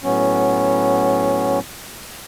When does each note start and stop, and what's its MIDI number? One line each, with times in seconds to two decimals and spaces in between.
0.04 1.59 45
0.04 1.59 54
0.04 1.59 59
0.04 1.59 61